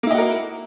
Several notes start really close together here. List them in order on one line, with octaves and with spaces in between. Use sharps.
A#3 E4 D#5 F#4 A#4